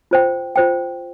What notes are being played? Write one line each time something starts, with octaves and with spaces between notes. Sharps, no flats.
F4 C5 G5
F4 C5 G5